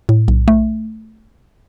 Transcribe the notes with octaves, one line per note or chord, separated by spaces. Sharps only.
A2
B1
A3